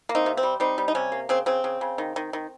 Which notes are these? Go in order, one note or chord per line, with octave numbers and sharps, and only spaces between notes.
A#3
C4 D#4
C3
C4
G3
G3 C4 D#4
G3
D#4
C3 C#4
A#3
C#3 C4
C#3 C4
C#3
C#3
D#3
D#3
D#3